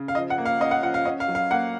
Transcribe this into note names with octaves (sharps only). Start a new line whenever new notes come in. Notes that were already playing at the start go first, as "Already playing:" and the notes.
Already playing: C#3
F5
F3 D#5
F#5
A#3
F5
C#4 D#5
F#5
F3 F#5
F5
C#4 D#5
F5
F#3
F5
A#3 F#5